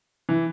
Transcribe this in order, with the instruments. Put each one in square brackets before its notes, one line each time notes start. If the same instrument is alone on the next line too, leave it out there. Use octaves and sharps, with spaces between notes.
[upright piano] E3